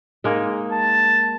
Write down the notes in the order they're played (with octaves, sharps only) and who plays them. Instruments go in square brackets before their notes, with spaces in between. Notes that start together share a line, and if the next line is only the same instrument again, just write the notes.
[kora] G#3 A#3 D#4
[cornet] A5